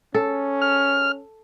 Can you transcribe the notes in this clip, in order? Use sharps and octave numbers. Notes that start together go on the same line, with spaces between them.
C#4 A4
F6